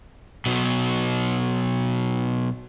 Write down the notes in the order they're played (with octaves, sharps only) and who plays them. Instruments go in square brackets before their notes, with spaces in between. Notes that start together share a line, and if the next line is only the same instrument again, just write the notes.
[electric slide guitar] B2 F#3